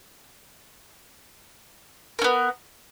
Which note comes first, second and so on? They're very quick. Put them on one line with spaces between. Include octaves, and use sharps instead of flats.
A#4 C#4 B3